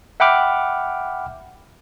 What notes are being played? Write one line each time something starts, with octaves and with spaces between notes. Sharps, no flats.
E5 F#5 G5 B5 D6 F6